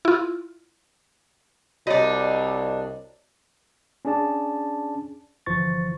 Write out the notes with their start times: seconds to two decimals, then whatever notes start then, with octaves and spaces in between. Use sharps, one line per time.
0.05 E4 F4
1.87 C2 D4 D#4 F#4 C#5 D#5
4.05 C#4 D4 G#4 D5 A5
5.46 G1 E3 F3 C5 C#6 A6